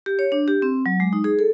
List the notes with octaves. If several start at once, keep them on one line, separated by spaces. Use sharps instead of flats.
G4
C#5
D4
G4
C4
F#3
G#3
D#4
G#4
A4